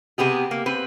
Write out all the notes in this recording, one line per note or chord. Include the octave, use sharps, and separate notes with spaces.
C3 B3 G4 G#4
A#3
C4 B4